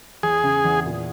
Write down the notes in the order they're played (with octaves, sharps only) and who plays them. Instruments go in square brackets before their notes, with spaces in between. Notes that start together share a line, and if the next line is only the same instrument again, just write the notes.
[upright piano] E2 [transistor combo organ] G#4
[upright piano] C#3
E2
A#2